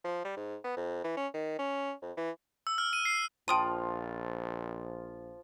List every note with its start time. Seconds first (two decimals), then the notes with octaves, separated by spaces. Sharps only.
0.04 F3
0.25 G3
0.37 G#2
0.64 B3
0.77 F2
1.04 E3
1.17 C#4
1.34 D#3
1.59 C#4
2.02 F2
2.17 E3
2.67 E6
2.78 F6
2.93 D#7
3.05 C7
3.48 A#1 F3 F4 G5 A5 C6 D#6 D#7